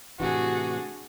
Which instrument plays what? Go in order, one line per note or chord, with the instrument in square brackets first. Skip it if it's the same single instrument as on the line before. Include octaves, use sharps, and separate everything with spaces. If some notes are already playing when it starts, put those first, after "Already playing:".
[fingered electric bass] A2 C3 E3 [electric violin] D4 G#4 [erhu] F#4